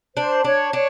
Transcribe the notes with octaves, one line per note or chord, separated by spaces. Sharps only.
D4 C5
D4 C#5
D4 C#5